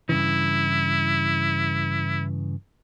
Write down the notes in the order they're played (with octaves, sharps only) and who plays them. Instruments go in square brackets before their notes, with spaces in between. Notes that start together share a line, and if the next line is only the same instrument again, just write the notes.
[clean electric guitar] G2 C#3 E3 [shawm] E4